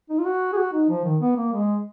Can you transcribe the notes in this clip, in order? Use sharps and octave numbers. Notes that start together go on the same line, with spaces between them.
D#4
F4
F#4
G#4
F#4
D#4
F3
D#3
B3
A#3
G#3